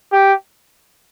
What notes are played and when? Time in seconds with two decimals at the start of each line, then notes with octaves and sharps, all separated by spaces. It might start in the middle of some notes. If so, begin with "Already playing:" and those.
0.12 G4